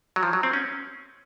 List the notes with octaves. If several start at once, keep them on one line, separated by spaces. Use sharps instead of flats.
F#3
F3
F#3
C4
C#4